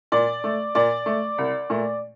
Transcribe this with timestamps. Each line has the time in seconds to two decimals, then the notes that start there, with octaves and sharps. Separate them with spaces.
0.12 A#2 D5
0.44 A3
0.75 A#2 D5
1.06 A3
1.38 C2
1.70 A#2 A3